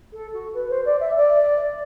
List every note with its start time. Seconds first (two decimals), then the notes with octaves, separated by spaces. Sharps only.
0.13 A4
0.34 F#4
0.54 B4
0.70 C5
0.85 D5
1.00 E5
1.17 D5